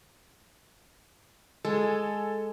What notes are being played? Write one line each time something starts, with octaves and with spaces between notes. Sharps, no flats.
G#3 A4 G#5